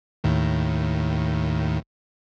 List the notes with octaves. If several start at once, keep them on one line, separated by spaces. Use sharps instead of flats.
D#2 A2 D#3